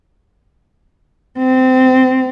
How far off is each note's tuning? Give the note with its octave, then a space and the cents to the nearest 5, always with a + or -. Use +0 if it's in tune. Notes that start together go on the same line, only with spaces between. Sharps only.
C4 -20